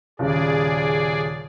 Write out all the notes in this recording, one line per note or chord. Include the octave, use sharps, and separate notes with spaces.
D#1 C#3 G#4 D5